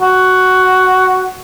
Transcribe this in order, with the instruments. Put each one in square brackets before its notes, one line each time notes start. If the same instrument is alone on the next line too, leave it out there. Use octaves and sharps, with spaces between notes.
[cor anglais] F#4